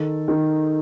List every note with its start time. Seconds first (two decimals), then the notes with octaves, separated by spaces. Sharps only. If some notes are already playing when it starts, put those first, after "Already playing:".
Already playing: D#3 A4
0.28 D#3